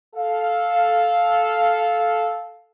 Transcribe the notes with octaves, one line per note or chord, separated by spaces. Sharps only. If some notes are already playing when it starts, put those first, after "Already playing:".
A4 F5